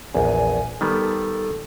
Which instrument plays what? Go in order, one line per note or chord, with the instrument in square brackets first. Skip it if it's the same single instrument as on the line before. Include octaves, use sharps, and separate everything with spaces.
[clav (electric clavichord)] A#1 E2 [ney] G#5
[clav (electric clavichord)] D#3 G3 B3 [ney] A4
[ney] A4